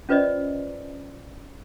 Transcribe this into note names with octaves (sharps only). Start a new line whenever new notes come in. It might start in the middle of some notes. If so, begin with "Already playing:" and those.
C#4 F4 B4 C5 D5 D#5